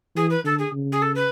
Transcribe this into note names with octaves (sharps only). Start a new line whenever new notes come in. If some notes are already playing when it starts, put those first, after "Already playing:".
E3 G#4
B4
D3 A4
G#4
C#3
G#4
A4
B4